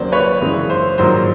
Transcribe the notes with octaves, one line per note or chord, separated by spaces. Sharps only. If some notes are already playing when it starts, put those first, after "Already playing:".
Already playing: D#2 C#3 F#3 C5 D5
B4 C#5
F#2 C#3 E3 G#3
C5
A#1 G#2 D#3 F#3 C5